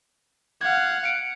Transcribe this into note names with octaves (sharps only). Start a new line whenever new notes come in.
F5 F#5 G#6
C#7 D7